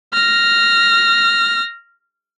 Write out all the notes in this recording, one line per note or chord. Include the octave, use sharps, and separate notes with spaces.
F6 A#6